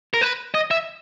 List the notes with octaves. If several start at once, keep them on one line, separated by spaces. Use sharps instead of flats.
A#4
B4
D#5
E5